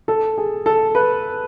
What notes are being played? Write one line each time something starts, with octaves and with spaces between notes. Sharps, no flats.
A4
G#4
A4
B4